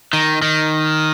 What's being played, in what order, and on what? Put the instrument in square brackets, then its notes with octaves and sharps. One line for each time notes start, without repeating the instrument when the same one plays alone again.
[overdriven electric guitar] D#3
D#3